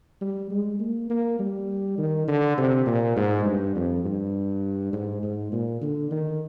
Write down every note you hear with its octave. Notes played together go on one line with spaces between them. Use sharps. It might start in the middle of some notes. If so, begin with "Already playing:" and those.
G3
G#3
A#3
A#3
G3
D#3
D3
C3
A#2
G#2
G2
F2
G2
G#2
G#2
A#2
D3
D#3